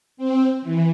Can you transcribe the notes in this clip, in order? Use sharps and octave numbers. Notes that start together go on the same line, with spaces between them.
C4
E3